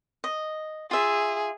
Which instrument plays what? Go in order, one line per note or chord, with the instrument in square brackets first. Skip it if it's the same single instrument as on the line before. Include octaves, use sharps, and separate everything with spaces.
[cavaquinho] D#5
[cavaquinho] F4 E5 [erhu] G#4